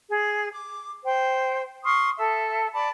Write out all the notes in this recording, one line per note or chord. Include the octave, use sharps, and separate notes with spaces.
G#4
D6
C5 G5
C6 C#6 D#6 F6
A4 E5
D5 A5 B5